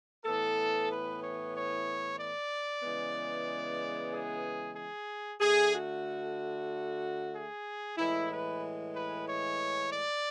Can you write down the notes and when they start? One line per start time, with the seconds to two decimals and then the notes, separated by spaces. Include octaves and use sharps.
0.25 A2 E3 B3 A4
0.90 B4
1.22 C#5
1.55 C#5
2.19 D5
2.83 C#3 E3 G#3 B3
4.12 G#4
4.75 G#4
5.40 D3 A3 G#4
5.73 F#4
7.33 G#4
7.98 A2 E3 G#3 E4
8.30 B4
8.95 B4
9.27 C#5
9.91 D5